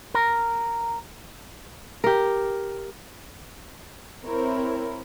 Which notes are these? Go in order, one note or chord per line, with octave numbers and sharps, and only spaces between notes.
A#4
G4 A#4
C4 E4 A#4 C#5